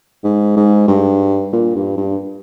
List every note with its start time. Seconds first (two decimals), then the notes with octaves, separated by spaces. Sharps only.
0.24 G#2
0.57 G#2
0.88 G2
1.53 A#2
1.76 G2
1.97 G2